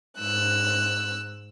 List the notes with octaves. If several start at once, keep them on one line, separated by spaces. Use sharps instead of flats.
G#2 E6 F#6